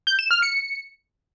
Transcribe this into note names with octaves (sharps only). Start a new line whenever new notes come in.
G6
E7
F6
C#7